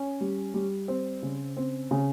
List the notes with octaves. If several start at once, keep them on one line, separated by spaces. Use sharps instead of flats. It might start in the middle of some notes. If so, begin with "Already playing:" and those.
Already playing: C#4
G3
G3
C4
C#3
C4
C#3